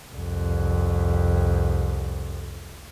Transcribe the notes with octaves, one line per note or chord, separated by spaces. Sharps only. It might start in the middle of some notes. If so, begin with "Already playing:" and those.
C2 F2